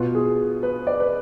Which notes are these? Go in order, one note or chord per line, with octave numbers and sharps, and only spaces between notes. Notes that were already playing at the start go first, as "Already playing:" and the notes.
Already playing: B2 B3 F4
G#4
B4
D5
B4